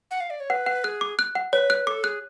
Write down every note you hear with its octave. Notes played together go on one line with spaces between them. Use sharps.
F#5
F5
D5
C#5
B4 F#5
F#5
G#4 F#6
D6
F#6
F#5
B4 C#5
F#6
A4 D6
G#4 F#6